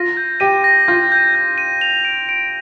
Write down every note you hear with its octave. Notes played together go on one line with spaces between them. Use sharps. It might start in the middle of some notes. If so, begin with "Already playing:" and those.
Already playing: F4 A#6
G6
G4 D#7
A#6
F4 G6
G6
G6
D#7
F7
D7
D7